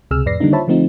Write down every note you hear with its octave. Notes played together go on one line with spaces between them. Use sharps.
C#2 C3 G#4 E6 F6
F2 A2 B4 D5 A#6 C7
D3 D#3 G3 A#3 D4 D#4
F4 C5 C#5 E5 A5 B5
D3 F3 A3 C4 D#4 F4